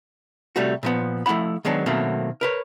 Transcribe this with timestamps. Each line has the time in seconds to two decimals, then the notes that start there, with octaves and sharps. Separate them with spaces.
0.56 C3 G3 A3 F#4
0.83 A#2 F3 B3
1.26 F3 A3 E4 F#5 B5
1.65 D#3 F#3 G#3 B3 D4
1.86 B2 D#3 F#3 A3 A#3 C4
2.41 A#4 B4 C#5